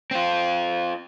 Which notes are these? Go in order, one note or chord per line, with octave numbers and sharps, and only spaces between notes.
C4 F4